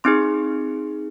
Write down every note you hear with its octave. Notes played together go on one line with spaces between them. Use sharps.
C4 D#4 G#4 C6